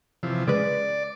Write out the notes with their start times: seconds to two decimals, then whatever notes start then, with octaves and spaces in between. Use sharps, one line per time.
0.23 C3 E3 F3
0.47 C#3 G#3 B4 D5